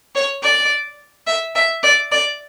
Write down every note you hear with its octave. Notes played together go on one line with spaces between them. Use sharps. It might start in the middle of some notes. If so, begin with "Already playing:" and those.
C#5
D5
E5
E5
D5
D5